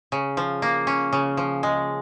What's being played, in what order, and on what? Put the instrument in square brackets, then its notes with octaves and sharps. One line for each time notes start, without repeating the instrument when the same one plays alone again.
[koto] C#3
F3
A#3
C#4
C#3
F3
G#3